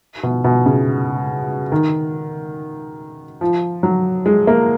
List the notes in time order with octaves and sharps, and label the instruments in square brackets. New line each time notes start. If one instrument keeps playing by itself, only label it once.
[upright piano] B2
B2
C#3
D#3
F3
F#3
G#3
A#3